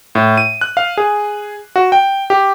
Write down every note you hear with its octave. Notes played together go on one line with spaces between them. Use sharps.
A2
D#7
F#6
F5
G#4
F#4
G5
G4